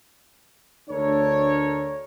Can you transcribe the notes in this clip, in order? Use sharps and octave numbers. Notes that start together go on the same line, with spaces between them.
D2 A3 D4 A4 A#4 C#5